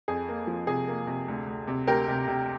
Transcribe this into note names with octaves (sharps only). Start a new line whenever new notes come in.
F2 G#4
A#3
F3
C3 G#4
A#3
C3
D2
D2
C3
D2 G4 A#4
C3
C3